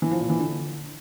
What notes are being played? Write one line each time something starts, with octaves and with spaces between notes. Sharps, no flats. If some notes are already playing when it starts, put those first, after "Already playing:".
E3
F3
A#2
E3
D3